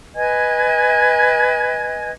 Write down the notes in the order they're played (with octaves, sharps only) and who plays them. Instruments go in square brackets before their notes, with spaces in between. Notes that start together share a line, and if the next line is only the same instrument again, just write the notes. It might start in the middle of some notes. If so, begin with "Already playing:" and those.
[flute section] B4 D#5 G#5 G#6